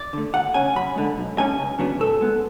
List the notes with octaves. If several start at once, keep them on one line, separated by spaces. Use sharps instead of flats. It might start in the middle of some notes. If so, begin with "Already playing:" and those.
Already playing: D5
D3 A3
D2 F#5
C#3 F#3 C#4 G#5
F#2 B5
D3 G#3
B1
A2 G#3 C#4 G#5
C#2
C#3 F#3 B3 D4
G#2 A4
G#3 B3